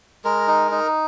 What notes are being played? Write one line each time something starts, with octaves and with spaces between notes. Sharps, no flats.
G#3 A#4
D#4
D#4